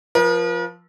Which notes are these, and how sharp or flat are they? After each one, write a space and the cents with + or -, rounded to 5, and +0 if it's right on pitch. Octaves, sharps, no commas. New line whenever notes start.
F3 +0 A#4 +45